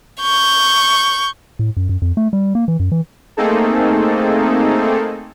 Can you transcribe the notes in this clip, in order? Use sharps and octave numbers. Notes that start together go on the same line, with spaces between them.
C#6 G6
A2
F#2
F#2
F2
A3
G3
A#3
E3
F#2
E3
A3 A#3 C4 D#4 G#4 A4